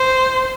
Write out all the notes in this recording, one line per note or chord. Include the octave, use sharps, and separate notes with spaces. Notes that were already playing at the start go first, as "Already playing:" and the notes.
Already playing: C5